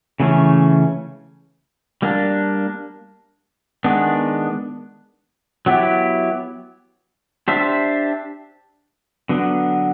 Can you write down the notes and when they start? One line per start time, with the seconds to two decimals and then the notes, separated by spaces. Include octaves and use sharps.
0.20 C#3 E3 A3 C#4
2.02 G3 A#3 D4
3.84 D#3 G#3 B3 D4
5.66 F#3 B3 E4 G4
7.48 D4 G4 C5 E5
9.29 D3 F#3 B3